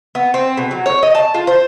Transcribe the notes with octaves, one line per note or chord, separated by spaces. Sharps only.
B3
C4
B2
F#3
C#5
D#5
A5
F4
C5